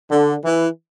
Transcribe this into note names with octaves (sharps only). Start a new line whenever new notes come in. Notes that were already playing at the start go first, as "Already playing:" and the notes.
D3
E3